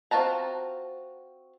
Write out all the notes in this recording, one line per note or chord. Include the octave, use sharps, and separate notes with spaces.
C4 F4 F#4 A5 A#5